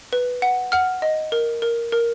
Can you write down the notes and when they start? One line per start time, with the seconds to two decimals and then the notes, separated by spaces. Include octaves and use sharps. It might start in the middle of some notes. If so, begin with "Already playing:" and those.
0.13 B4
0.42 F#5
0.72 F#5 F6
1.02 D#5
1.32 A#4
1.62 A#4
1.92 A#4